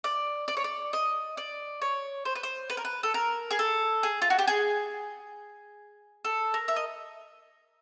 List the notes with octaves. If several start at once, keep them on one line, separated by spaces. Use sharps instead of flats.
D5
D5
C#5
D5
D#5
D5
C#5
C5
B4
C5
B4
A#4
B4
A4
A#4
G#4
A4
G#4
F4
F#4
G4
G#4
A4
A#4
E5
D#5